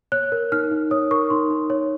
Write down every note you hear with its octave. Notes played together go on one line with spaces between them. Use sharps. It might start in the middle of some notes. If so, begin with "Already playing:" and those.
C#5 F#6
A#4
D#4 F6
D#4
C#5 D#6
A#4 C#6
D#4 C6
D#4
C#5